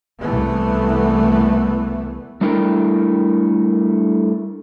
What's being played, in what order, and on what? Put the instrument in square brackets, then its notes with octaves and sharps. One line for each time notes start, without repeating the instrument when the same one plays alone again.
[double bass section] C2 E3 A3 B3
[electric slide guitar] G3 A3 D4 E4 A#4 G5